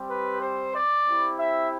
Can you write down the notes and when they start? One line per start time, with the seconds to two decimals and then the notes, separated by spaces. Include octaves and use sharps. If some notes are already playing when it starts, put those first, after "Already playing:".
Already playing: G3 C4 G4
0.09 B4
0.42 C5
0.74 D5
1.07 C4 E4 G4
1.39 E5